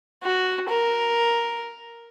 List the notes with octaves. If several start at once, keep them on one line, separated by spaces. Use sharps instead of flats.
F#4
A#4